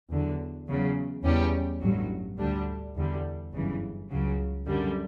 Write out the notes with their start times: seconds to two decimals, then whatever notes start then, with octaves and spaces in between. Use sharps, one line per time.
0.10 E2 D3 F#3
0.67 E2 C#3 F#3
1.23 E2 C#3 G3 C#4 G4
1.81 A1 G2 F#3
2.38 D2 D3 G3 D4
2.95 E2 D3 G3
3.52 G1 F#2 C#3 E3
4.10 C#2 C#3 F#3
4.66 F#2 D3 G3